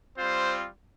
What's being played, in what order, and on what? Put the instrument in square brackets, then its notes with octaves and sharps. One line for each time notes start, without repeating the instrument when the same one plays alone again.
[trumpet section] G3 C4 F4 C5